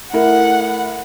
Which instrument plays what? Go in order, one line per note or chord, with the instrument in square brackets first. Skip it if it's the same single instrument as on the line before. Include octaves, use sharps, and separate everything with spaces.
[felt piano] A3 E4 A#4 [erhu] F#5